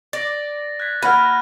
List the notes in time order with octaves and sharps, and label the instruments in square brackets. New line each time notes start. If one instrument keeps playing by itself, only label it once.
[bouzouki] D5 [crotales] A6 A#6
[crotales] F#6 G#6 B6
[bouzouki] A#3 [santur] F#5 B5 [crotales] F6 D#7